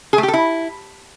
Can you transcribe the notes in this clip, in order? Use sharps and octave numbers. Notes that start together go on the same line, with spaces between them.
G#4
A3
G4
A4
E4